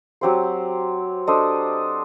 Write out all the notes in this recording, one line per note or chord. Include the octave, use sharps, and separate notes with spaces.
F#3 C4 G4 C5
D4 A4 C5 D#5